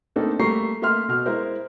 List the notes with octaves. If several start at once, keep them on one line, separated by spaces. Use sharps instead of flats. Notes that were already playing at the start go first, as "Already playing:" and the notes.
A3 A#3 C4 D4 D#4 A4
G3 A3 A#3 A#5 C#6 C7
A3 A#3 E5 C6 F6
B2 F6
G#3 E4 A#4 C5